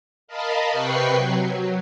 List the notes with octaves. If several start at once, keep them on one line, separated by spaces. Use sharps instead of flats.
A#4 D#5 F5 A5 B5
C3 B4 G5 B5 C#6 C7
F#3
F#3